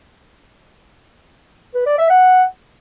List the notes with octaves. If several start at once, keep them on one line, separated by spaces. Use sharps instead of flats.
B4
D5
E5
F#5